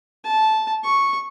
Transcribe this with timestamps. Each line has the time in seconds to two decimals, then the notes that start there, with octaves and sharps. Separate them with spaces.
0.24 A5
0.83 C#6